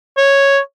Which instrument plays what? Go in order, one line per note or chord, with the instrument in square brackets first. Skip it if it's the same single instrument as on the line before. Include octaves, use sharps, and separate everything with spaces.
[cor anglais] C#5